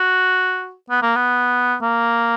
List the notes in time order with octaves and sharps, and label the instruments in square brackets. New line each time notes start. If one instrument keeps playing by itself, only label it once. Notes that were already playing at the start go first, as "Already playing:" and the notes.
Already playing: [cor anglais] F#4
B3
A#3
B3
A#3